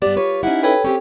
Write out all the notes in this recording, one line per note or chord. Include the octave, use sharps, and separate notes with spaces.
G2 B3 G4 D5
F4 B4 C#5
C#4 D#4 E4 F#5
A4 B4 C#5 G5
C4 C#4 G4 B4